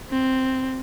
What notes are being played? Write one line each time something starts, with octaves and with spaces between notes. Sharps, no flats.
C4